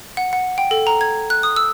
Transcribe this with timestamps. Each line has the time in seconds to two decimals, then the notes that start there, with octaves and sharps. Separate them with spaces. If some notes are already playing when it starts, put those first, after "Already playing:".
0.17 F#5
0.33 F#5
0.58 G5
0.71 A4
0.87 A#5
1.01 G#6
1.30 F#6
1.43 D#6
1.56 E6